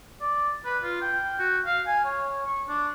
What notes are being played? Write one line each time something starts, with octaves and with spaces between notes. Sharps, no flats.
D5
B4
F4
G5
F#4
F5
G#5
C#5
C#6
D4